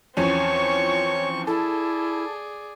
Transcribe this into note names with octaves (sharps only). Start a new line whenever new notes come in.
E2 F3 C4 C#4 C#5 C#6
E4 G#4 A4 D5